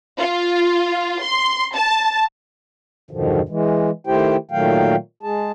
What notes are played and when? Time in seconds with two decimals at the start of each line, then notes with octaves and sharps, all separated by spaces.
0.18 F4
1.22 C6
1.75 A5
3.11 E2 G2 B2 D3 D#3 F3
3.49 E3 G#3
4.07 D#3 A3 E4 G4 C5 G5
4.51 A#2 D#3 F#3 A3 F5 G5
5.23 G#3 G#4 A5